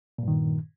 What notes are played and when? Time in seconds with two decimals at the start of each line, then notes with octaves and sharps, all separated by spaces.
0.18 A#2
0.23 G2
0.28 D#3